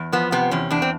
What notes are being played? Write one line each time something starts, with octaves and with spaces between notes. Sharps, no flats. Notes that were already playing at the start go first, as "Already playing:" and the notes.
Already playing: E2
F3 B3
C3 B3
E2 C#4
E2 D4
C4